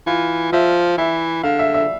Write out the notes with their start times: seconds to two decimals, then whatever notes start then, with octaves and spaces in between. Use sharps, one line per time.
0.07 E3 F4
0.53 F3 E5
0.98 E3 E5
1.43 D3 F5
1.59 E5
1.74 E5